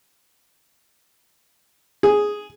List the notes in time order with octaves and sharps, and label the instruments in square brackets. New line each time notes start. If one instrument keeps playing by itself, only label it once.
[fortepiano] G#4